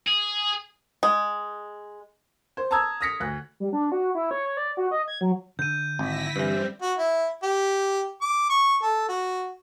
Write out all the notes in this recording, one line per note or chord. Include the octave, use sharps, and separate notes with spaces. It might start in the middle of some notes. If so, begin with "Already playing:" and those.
G#4
G#3
C5
A5 A#5 D#6 E6 G#6
D#6 F6 A#6 B6 C#7
D2 F#6
G3
D4
F#4
E4
C#5
C#5
D5
F#4
D#5
G#6
F#3
D3 G6 D#7
G#1 E4 A#6 B6
G2 E3 G3 C4
F#4
E4
G4
D6
C#6
A4
F#4